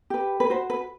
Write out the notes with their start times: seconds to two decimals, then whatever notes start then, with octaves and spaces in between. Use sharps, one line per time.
0.10 G4 B4
0.40 B4
0.50 F#4 C5
0.70 B4